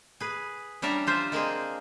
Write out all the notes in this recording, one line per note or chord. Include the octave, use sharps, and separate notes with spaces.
G#4 B4
G3 C#4 D4 E5 A#5
F4 C5 E5
G#3 A#3 C4 G#4